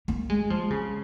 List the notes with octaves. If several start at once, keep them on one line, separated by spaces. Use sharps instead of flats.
A#3
G#3
F3
C#3